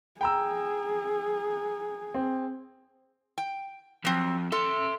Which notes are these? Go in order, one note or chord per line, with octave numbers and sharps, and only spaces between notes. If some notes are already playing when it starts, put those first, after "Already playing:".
G#4 G5 A#5 E6
C4
G5
F2 F#3 C4
A4 E5 C6